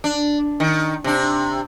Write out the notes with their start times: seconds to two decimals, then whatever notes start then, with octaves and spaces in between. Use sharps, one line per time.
0.04 D4
0.60 D#3
1.04 C3 D4